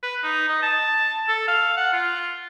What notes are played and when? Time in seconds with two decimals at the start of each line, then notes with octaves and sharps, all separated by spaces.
0.03 B4
0.23 D#4
0.49 D#5
0.62 A5
1.28 A4
1.48 F5
1.77 F#5
1.93 F4